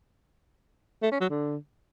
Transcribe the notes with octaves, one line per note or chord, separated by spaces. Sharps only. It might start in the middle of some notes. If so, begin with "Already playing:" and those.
A3
C#4
F#3
D3